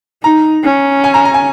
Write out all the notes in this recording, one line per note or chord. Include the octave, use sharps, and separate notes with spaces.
D#4 A#5
C#4
G#5
A#5
A#5
G#5